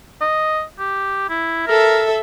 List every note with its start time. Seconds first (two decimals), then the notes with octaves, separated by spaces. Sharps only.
0.21 D#5
0.79 G4
1.30 E4
1.67 A4 A#4 E5